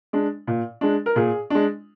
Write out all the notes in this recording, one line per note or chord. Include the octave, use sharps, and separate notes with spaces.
G#3 D4
A#2
G#3 D4
A#4
A#2 G#4
G#3 D4